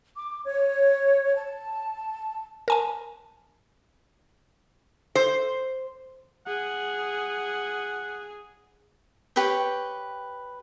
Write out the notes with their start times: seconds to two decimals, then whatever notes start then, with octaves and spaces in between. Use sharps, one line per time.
0.17 D6
0.45 C#5
1.35 A5
2.68 A#4 G#5 A5
5.15 C5
6.47 G#4 F#5
9.36 G4 B4 C#5 G5